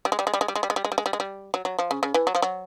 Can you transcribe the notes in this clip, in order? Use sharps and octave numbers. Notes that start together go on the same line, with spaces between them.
G3
G#3
G3
G#3
G3
G#3
G3
G#3
G3
G#3
G3
G#3
G3
G#3
G3
G#3
G3
F#3
F#3
F3
C#3
C#3
E3
F#3
F3
F#3